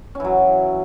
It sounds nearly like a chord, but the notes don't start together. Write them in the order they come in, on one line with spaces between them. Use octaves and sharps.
C#4 E3 F#3